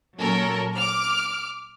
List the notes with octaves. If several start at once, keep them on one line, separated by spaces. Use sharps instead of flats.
A#2 F#3 C#4 A4 A#4
D6 F6